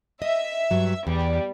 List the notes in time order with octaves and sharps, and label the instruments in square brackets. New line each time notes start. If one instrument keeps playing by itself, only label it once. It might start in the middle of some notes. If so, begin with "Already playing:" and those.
[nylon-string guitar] D#5 [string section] E5
[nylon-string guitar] G2 F#3
[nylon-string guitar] E2 [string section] G3